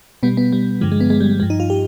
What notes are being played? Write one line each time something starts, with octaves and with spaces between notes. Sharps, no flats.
B2 G3 B3
B3
G3
G2 D3 F3 G#3
G#3
B3
G#3
G3
G#3
G2 F3 G#3
D#4
F4
G4